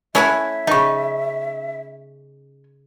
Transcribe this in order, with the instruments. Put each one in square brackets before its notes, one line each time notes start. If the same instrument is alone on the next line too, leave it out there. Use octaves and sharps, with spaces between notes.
[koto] A3 E4 F#5 [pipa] C#4 C#5 G#5 [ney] E5
[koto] C#3 D#4 [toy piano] D#5 C#6